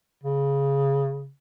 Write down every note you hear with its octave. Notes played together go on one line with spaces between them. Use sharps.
C#3